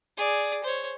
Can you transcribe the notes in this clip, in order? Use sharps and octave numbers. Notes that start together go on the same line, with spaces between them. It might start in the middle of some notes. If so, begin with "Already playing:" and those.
G#4 D5
C5 C#5